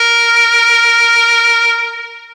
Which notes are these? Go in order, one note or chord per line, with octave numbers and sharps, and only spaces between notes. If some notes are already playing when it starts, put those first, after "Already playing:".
Already playing: A#4